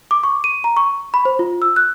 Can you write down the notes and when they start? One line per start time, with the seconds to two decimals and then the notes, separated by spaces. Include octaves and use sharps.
0.11 D6
0.23 C#6
0.44 D#7
0.64 A#5
0.77 C#6
1.14 B5
1.25 C5
1.39 F4
1.62 E6
1.76 F#6